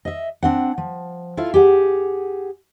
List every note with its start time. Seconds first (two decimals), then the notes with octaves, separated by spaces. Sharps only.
0.05 D#5 E5
0.43 C4 D4 F#5
0.78 F3
1.37 E4 F4 A4 F5
1.54 G4 G#4 F#5